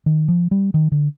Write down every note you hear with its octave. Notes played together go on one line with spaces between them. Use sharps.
D#3
F3
G3
D#3
D3